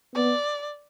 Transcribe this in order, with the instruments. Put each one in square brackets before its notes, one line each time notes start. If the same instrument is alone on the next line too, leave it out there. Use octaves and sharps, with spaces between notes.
[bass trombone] B3 [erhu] D5